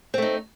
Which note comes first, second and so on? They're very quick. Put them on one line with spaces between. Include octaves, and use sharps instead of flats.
C4 A3 D#4